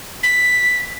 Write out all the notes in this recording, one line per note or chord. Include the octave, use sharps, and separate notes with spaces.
B6